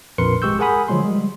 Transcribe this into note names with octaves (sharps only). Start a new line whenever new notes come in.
A#1 F2 A#4 B4 C6 C#7
G#1 G#3 G4 C#6 E6 G6
G#4 A#4 F#5 G#5 B5 D#6
D3 F3 F#3 G#3 C6
G3 G#3